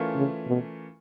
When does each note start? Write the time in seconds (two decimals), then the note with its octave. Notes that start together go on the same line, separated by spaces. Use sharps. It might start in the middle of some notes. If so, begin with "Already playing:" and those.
Already playing: E3 A3 C#4 F4 A#4
0.15 C#3
0.47 B2